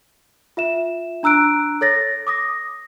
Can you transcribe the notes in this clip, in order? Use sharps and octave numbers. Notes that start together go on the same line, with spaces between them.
F4 E5 E7
D4 A#5 E6 F#6 D7
A4 C#5 A6 A#6
D6 D#6 A#6